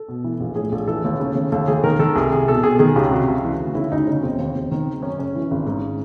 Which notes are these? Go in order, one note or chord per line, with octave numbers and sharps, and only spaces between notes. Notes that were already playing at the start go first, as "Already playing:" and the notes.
Already playing: A4
B2
E3
A#1
A2 G#4
A#1 A4
E3 A4
D#2
C#3
D#2
D#2 A4
D#2 G#4
D#3 A#4
D#3 A4
C2 G#4
C2 G#4
B2 A4
B2 G#4
D#3 G#4
C#2 G4
C3 F#4
C#2
E3
D2
C#3 E4
D2 D#4
C#3 C#4
E1 C4
D#2
E1
D#3
F#1
F#2 C#4
F#1 C#4
E3
G#1
G#2